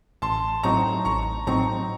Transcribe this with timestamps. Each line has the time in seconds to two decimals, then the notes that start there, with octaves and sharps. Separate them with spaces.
0.22 A1 A5 C6
0.63 A2 F#3 C4 D#4 A#5 C#6
1.05 A1 A#5 C#6
1.47 A2 F#3 C4 D#4 A#5 C#6